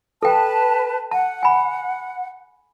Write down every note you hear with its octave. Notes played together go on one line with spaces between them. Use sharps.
A4 B4 G5 A5
F#5 A5
G#5 B5